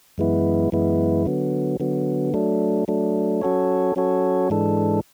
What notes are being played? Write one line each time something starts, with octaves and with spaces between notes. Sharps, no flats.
F#2 E3 G#3 B3 E4
F#2 E3 G#3 B3 E4
D3 F#3 B3
D3 F#3 B3
F#3 A3 D4
F#3 A3 D4
F#3 C#4 F#4 A4 C#5
F#3 C#4 F#4 A4 C#5
G#2 E3 G#3 D4 A4